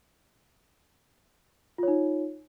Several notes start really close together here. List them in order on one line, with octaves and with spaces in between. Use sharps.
F4 C#5 D#4